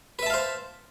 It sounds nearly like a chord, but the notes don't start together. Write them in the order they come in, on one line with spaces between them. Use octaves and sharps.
B4 E5 A5 F5 C5